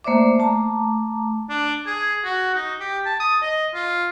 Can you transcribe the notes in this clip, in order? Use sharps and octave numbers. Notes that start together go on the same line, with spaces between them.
A3 A#3 C5 D5 E5 D6
A3 A5 A#5 D6
D4
G#4
F#4
D#4
G4
A5
D#6
D#5
F4